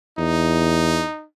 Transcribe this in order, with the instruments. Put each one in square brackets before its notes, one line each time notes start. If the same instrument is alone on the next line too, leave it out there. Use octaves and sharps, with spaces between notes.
[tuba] E2 [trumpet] D#4